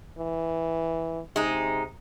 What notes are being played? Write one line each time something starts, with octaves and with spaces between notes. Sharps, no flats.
E3
C3 G#3 D#4